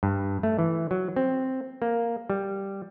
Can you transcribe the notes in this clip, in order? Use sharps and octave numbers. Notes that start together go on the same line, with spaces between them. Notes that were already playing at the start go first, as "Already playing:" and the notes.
G2
A3
E3
F#3
C4
A#3
G3